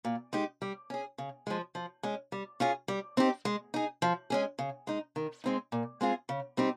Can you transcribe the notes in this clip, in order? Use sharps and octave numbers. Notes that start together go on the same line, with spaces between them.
A#2
G#3 D#4 G4
G3
C#4 G#4
C#3
F3 G#3
F3
G#3 C#4
G3
C#4 F4 G#4
G3
C4 D#4 G4
G#3
D#4 G#4
F3
G#3 C#4 G#4
C#3
G#3 D#4
D#3
G#3 C4 D#4
A#2
G#3 C4 F4 G#4
C#3
G3 C4 D#4 G4